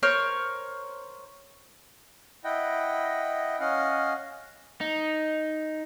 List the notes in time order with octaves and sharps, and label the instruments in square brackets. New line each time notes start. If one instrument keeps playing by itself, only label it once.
[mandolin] A#4 C5 C#5 F6
[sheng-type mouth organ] E4 D#5 F#5 G5
C#4 D#5 F5 F#5
[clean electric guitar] D#4